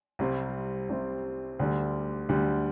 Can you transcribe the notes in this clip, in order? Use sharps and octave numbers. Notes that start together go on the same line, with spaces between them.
C2 C3 G3 C4
C2 C3 G3 C4
D2 D3 G3
D2 D3 G3